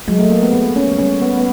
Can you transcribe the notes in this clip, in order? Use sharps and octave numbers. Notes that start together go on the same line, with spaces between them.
F#3 G#3
A3
A#3
B3
B3
C#4
F#3
G3 C#4
B3
B3